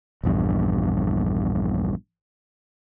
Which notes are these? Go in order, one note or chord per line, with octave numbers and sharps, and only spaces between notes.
A#1 E2 G2